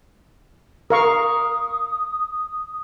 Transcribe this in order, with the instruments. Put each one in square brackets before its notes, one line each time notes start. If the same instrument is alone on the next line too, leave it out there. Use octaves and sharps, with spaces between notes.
[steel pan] A#4 F5 C#6 [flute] D#6